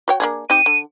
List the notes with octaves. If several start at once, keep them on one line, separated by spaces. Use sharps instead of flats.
F#4 C#5 G5
A#3 D4 G#4
C4 D#4 G4 D#7
D3